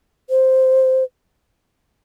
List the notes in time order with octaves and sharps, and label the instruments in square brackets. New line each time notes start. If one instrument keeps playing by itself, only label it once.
[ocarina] C5